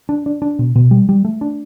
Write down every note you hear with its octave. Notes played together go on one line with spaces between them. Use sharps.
D4
D4
D4
B2
B2
G3
G3
A3
D4